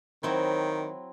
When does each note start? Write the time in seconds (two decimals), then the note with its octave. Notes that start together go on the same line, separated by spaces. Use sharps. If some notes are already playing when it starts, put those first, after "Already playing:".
0.23 D#3 F#3 C4 E4